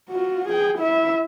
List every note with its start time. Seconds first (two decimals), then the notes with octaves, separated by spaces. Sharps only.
0.10 F4 F#4
0.48 G#4 G5
0.79 E4 E5